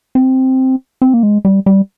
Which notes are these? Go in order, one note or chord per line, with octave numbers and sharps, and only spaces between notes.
C4
C4
A#3
G#3
G3
G3